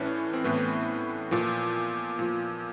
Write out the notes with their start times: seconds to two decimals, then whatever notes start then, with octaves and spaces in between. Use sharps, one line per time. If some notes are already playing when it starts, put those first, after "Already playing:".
Already playing: A2 E3 C#4 D4
0.33 C4
0.44 A2 E3 B3
1.31 A#2 F3
2.19 A#2 F3